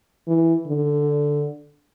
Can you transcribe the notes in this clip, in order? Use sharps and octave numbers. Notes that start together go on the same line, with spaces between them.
E3
D3